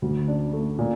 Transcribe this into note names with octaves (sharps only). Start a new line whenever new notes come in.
D2
D4
A3
A#2